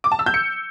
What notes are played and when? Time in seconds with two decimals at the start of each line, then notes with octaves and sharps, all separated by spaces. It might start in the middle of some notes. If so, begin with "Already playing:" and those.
0.04 D6
0.12 A5
0.19 E6
0.26 G6
0.34 C#7